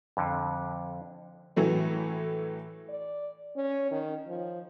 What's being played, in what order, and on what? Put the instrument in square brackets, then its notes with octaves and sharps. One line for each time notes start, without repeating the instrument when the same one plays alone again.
[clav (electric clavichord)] F2 D3
[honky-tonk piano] A2 E3 F#3 A3
[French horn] D5
C#4
D#3
F3